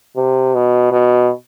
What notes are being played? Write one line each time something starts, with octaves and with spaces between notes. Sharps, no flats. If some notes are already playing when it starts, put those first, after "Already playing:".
C3
B2
B2